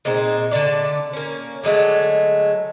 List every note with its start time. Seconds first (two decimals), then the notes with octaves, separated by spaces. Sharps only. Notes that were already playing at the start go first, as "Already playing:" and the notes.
0.05 A#2 G#3 C4 D#4
0.51 D3 A3 D4 D5
1.13 A#3 C#4
1.63 D3 F#3 G#3 A3